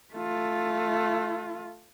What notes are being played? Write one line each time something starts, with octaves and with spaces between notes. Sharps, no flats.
A3 F4